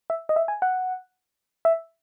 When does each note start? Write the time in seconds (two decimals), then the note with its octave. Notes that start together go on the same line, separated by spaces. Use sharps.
0.10 E5
0.29 D#5
0.36 E5
0.48 G#5
0.62 F#5
1.65 E5